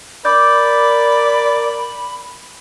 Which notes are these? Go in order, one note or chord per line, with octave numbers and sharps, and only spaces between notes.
A#4 D5 B5 D6 G6